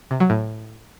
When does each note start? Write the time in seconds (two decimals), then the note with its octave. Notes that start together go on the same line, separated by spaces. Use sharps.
0.11 C3
0.20 F#3
0.30 A2